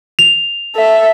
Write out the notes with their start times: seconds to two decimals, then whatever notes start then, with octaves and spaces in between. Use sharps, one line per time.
0.19 F7
0.75 A4 E5